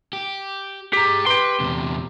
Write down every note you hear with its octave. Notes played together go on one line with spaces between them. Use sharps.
G4
G4 G#4 A#5
G4 B4 C6
E2 C3